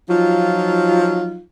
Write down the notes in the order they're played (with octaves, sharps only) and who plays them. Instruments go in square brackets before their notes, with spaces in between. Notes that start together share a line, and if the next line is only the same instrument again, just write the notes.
[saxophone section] F3 F#3 D#4 F4